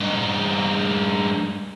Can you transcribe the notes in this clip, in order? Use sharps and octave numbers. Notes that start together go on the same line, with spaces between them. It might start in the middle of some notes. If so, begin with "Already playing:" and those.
G2 D#4